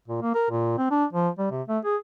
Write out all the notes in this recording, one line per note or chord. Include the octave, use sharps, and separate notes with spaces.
A#2
A#3
A#4
A#2
C4
D4
F3
G3
C3
A3
G#4